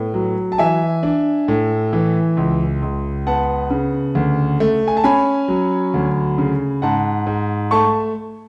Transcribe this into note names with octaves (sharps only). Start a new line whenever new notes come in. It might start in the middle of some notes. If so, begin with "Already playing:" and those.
Already playing: A2 B3
F#3
A5
E3 E5 G#5
D4
A2
E3
C#2
C#2
B3 F#5 A5
C#3
D2
A3
G#5
A5
C#4 G#5 B5
F#3
D2
C#3
G#2 F#5 A5
G#2
A3 A5 C#6